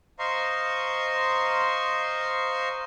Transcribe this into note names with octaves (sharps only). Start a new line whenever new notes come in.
C5 D#5 F5 A#5 C6 C#6